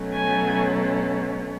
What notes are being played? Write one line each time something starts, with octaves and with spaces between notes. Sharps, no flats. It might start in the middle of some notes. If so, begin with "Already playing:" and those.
Already playing: B2 F#3 A3 C#4
G#5